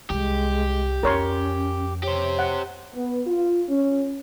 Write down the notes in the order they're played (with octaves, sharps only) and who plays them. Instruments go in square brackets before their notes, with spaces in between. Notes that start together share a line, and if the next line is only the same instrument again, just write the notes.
[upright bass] C2 G3 [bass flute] G#3 [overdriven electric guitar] G4
[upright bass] F2 [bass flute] C#4 [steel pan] A#4 C#5 C6
[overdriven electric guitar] G4 C5 [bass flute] C#5
[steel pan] F#5
[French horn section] B3
F4
C#4